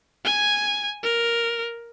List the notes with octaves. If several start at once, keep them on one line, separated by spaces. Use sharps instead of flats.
G#5 G#6
A#4